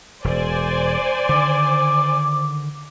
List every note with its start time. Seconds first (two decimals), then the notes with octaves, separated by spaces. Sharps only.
0.24 E1 C5 D5 G#5
1.29 D3 D#3 D6